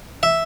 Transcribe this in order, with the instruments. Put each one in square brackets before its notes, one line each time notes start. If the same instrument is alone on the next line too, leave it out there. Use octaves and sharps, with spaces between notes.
[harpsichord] E5